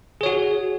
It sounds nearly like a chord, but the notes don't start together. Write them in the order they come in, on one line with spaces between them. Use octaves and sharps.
G#4 C#5 F#4